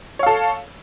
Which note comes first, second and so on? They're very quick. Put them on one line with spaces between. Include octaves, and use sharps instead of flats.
C#5 F5 A4